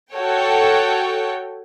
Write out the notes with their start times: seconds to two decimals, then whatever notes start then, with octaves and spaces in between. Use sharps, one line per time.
0.13 F#4 A4 C#5 G5